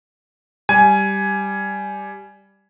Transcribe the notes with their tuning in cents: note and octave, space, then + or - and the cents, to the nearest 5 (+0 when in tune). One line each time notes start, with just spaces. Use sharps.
G3 +0 G#5 +10